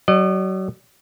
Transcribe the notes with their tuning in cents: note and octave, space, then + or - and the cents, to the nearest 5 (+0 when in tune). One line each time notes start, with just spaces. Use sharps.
F#3 +30 D#5 -40